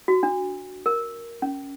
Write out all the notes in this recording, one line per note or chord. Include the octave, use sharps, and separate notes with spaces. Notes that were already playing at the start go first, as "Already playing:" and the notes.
F#4
D4
A#4
C#4